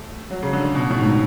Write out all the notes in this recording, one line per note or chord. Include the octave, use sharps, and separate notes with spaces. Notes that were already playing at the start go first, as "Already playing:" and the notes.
Already playing: A3
F#3
C#3
D3
B2
A2
G#2